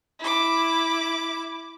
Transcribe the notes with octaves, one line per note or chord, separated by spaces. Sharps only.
E4 D6